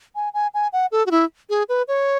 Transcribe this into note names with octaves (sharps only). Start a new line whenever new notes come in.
G#5
G#5
G#5
F#5
A4
F#4
E4
G#4
B4
C#5